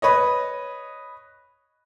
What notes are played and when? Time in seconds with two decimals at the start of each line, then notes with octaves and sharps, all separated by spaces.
0.02 B4 C#5 D#5